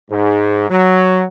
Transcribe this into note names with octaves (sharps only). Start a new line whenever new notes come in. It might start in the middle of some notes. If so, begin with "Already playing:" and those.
G#2
F#3